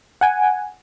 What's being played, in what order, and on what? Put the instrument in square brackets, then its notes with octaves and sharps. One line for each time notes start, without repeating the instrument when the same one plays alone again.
[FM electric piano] F#5 G#5